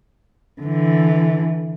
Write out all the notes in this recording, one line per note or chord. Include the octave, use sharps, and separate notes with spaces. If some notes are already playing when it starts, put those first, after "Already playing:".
D3 E3